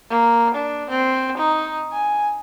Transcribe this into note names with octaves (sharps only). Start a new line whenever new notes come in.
A#3
D4
C4
D#4
G#5